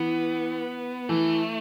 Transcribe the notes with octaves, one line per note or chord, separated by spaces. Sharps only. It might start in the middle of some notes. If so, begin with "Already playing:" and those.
Already playing: E3 B3
E3 A3